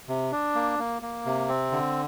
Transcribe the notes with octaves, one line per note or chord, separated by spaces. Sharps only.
C3
D4
A#3
A#3
A#3
C3
C4
D3